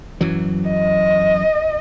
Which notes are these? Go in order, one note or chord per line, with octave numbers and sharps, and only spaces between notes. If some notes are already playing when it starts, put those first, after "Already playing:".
F#2 E3 F#3
D#5